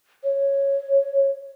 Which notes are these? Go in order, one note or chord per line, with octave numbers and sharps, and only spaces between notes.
C#5